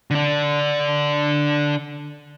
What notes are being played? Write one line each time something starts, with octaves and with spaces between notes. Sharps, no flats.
D3 D4